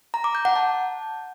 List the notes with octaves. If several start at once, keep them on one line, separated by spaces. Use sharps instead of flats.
A#5
D6
G6
F#5
A5